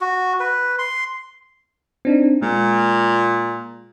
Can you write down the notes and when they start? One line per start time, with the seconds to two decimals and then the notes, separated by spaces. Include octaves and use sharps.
0.01 F#4
0.40 B4
0.78 C6
2.05 C4 D4 D#4
2.42 A#2 G#3